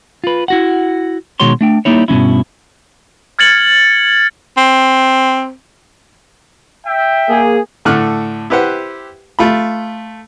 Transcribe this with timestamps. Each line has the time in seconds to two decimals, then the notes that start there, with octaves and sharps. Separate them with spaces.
0.24 F4 B4
0.48 E4 F#4 F#5
1.40 B2 D#3 G#3 F#4 C#5 C6
1.61 A3 D4 G5
1.85 G3 A#3 D#4 E4 C#5
2.08 G2 B2 E3 C#4 E4
3.39 F6 G#6 A6 C#7 F#7
4.57 C4
6.86 E5 G5
7.30 A#3 G#4
7.85 A2 D3 A3 F6 F#6
8.50 E4 G4 B4 C5 F#5
9.39 A3 F4 B5